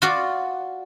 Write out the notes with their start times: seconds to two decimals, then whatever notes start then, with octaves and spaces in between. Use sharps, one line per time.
0.02 F4 F#4 D5